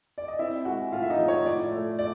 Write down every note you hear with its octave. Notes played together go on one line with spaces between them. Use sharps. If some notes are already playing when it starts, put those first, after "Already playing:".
D5
D#5
C4 E4 E5
G#3 F#4 F#5
A2 F4 F5
E5
D#4 D#5
F3
C#5
A2 D5
A3
D5